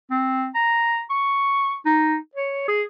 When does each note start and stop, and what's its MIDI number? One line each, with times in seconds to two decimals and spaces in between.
0.11 0.48 60
0.55 1.02 82
1.10 1.75 85
1.86 2.17 63
2.35 2.63 73
2.68 2.83 68